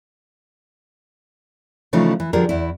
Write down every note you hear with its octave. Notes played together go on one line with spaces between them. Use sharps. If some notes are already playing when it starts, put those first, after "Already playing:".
C#3 E3 F3 A3 D#4
E3
D3 F3 G3 G#4 A#4
E2 E4